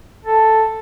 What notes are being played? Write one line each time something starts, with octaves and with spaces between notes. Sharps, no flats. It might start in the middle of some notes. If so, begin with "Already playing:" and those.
A4